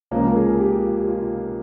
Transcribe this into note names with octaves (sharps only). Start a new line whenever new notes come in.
C#2 C#3 F3 A#3 A#4
A#4
G#4
G4
G4
F4